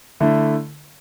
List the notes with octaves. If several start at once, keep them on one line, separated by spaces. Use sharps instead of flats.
D3 A3 E4